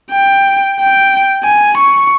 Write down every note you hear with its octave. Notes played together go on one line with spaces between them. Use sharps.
G5
G5
G#5
C#6